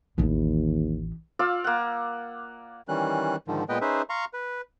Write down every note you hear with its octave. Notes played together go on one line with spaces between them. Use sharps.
A1 D#2 E3
F4 D5 F5 E6
A#3 F#5
D#3 E3 G3 C#4 F#6
G#2 D3 D#3 F3
A#2 G#3 B3 B4 D#5 G5
C#4 D#4 G#4 B4 C5 E5
F5 A#5 C6 C#6
B4